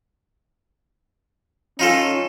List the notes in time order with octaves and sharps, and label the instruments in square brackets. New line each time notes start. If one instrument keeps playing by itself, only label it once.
[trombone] C#4 [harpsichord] D#4 F4 A4